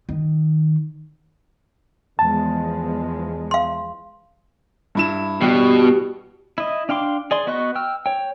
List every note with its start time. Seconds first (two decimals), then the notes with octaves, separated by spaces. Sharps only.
0.09 D#3
2.19 E2 F3 G#3 A5
3.51 F5 C6
4.95 G2 E4 E7
5.41 B2 G3 F#4
6.58 E4 D#5
6.89 D4 F5 G5 C6 D6
7.31 G#4 D5 C6
7.47 B3 F#4 D#5 C#6 F#6
7.75 G5 E6 F6
8.06 C#5 G5